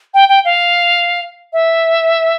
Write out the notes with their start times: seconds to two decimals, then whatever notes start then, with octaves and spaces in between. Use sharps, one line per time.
0.14 G5
0.29 G5
0.45 F5
1.53 E5